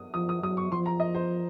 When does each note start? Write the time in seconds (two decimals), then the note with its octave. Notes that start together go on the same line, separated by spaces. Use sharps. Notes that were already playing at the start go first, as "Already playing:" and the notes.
Already playing: D#6
0.14 F3 D#6
0.29 D#6
0.43 F#3 D#6
0.57 C#6
0.72 F3 C6
0.86 A#5
1.00 D#5
1.15 C5